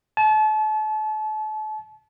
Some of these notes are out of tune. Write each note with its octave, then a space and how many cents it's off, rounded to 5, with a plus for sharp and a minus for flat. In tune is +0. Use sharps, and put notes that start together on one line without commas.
A5 -35